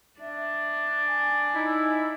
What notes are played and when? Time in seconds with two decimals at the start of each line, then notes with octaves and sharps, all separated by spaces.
0.20 D4 E5
1.07 G#5
1.54 D#4 E4